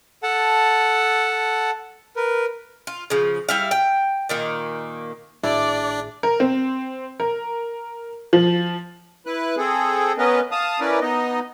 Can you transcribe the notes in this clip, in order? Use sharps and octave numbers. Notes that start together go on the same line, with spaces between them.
A4 F#5 A5
A#4 B4
F4
C#3 F3
G3 E4 F5
G5
A#2 D#3 A#3
G#1 A2 D4 E4 G#4 D5
A#4
C4
A#4
F3
E4 B4 F#6
C4 G#4 A4
B3 C#4 A#4 B4 D#5
F5 A5 D#6
C#4 E4 A#4 B4 D5
B3 D#4 D#5